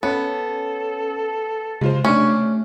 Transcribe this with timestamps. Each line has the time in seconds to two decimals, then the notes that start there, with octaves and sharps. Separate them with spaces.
0.03 B3 C#4 A4
1.81 C#3 G#3 F4 C5
2.05 C3 A3 C#4 D4